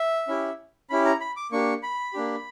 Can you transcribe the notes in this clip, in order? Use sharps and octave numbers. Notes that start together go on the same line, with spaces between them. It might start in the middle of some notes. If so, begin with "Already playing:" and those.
Already playing: E5
C#4 E4 G4
C#4 E4 G4 B5
A#5
B5
D6
A#3 D4 G4 C#6
B5
A#3 D4 G4